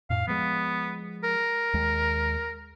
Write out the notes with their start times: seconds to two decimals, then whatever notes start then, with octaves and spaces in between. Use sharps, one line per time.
0.10 F2 A2 F5
0.27 F3 G#3 B3
1.24 A#4
1.74 D#2 G#3